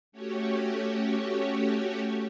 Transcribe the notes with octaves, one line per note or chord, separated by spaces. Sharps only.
A3 C#4 F#4 G4 C#5